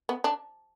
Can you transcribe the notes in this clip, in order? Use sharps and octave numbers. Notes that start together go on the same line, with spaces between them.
B3
D4